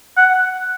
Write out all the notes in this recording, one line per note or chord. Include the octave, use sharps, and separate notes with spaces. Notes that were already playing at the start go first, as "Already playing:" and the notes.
F#5